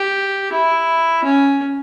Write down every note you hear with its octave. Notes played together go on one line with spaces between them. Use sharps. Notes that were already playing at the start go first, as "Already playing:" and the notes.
Already playing: G4
E4
C#4